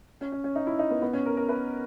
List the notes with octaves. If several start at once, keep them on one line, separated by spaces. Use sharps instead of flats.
C#4
C#4
C#4
D#4
E4
D#4
B3
B3
C#4
A#4
A#4
B4